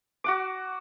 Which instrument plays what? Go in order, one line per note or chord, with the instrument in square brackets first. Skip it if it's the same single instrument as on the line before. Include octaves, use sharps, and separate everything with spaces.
[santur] F#4 F#5 D6